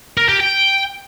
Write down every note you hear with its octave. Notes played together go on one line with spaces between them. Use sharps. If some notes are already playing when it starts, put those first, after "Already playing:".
A#4
G4
G5